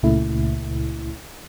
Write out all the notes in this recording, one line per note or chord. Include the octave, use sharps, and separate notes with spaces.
C#2 A#2 C#3 A3 E4